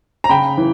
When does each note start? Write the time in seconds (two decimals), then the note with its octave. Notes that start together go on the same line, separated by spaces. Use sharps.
0.24 A#5
0.29 C#3 G5 B5
0.57 E3